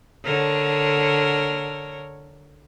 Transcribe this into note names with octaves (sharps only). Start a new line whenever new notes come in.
D3 A#4 C#5